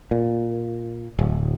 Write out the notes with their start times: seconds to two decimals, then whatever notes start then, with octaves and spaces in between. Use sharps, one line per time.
0.11 A#2
1.19 D1